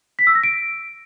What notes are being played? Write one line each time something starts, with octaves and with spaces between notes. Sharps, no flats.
B6
E6
A#6
D7